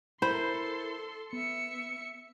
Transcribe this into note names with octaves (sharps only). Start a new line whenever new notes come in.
E4 A4 A#4 C5 B5 C6
B3 E5 C#7